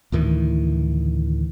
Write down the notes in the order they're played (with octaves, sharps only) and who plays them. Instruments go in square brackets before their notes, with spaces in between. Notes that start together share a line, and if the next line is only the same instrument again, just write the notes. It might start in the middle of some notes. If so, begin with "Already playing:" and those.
[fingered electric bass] D2 A2 D#3 E3